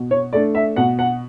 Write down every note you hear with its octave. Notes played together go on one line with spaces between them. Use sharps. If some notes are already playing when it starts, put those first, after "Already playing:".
Already playing: B2
C#5
A3 D4 D5
E5
B2 F#5
F#5